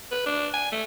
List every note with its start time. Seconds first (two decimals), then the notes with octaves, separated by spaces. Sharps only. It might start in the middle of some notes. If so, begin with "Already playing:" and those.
0.11 B4
0.26 D4
0.54 G#5
0.72 A3